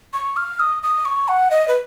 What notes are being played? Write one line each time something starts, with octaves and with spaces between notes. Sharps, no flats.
C#6
F6
D#6
D#6
C#6
F#5
D#5
B4